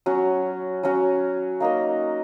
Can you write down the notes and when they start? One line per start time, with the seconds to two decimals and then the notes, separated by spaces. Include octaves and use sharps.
0.06 F#3 C#4 F#4
0.83 F#3 C#4 F#4
1.60 A#3 D#4 A#4 D#5